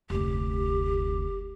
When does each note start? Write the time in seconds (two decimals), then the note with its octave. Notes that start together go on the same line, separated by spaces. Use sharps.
0.10 F1 D2 G4